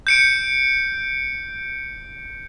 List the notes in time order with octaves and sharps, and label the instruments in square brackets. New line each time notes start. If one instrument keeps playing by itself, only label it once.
[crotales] G6 C#7 D7